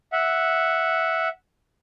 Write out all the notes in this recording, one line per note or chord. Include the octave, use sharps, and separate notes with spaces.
E5 F#5